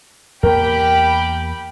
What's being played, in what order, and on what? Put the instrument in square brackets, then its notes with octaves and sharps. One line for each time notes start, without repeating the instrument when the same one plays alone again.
[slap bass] E2 A#3 [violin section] G4 G5 B5 [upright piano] A#4